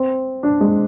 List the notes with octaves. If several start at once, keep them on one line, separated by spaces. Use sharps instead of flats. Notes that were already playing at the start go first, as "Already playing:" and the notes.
Already playing: C4
D4
G#3